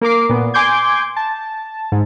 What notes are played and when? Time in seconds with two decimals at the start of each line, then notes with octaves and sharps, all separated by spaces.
0.01 A#3 A#4 D6 C7
0.29 A#2 B3
0.54 G#5 C6 D6 G6 G#6
1.16 A5
1.92 G#2